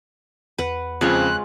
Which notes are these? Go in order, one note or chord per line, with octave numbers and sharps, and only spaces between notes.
E2 B4 F#5
F2 C#3 G#3 C4 F4 C#5 F#6